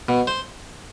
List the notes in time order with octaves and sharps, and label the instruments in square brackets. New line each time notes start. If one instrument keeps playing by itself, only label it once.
[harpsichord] B2
C5